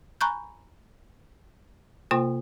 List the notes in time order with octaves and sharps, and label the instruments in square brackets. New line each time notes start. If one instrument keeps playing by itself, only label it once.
[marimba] G#5 A#5 B5 C#6 F#6 G6
C3 A#3 F4 C5 G5 C6